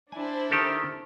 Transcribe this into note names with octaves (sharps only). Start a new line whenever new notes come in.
D4 E4 C5 G#5
D#3 G4 A4